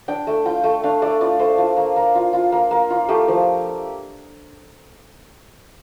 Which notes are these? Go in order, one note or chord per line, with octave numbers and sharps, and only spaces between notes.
D4 G5
A3
F4 G5
A3
D4 F5
A3 D5
F4 D5
A3 C5
F4
A#3
A#3
F4
F4
A#3
A#3
F4
A3 G4
F3